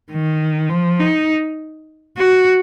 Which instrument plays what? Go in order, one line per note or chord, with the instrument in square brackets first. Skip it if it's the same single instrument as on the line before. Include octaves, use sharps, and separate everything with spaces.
[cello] D#3
F3
D#4
F#4